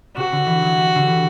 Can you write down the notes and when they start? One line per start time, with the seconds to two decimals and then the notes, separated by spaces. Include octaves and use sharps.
0.16 C3 F#4
0.32 D3
0.46 E3
0.62 F#3
0.77 G3
0.95 D3
1.07 E3